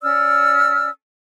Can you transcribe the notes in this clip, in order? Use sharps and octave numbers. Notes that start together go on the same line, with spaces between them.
C#4 D5 E6 F6